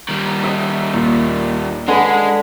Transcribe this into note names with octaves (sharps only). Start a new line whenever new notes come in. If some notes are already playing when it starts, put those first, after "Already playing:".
D#3 G3
D#5 E5
D#2 A#2
D3 G#3 B4 G#5 B5